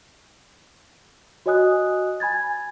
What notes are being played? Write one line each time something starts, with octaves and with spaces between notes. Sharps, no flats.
F#4 C#5 D#5 G#5 D#6 F#6
G#5 B5 G#6 A6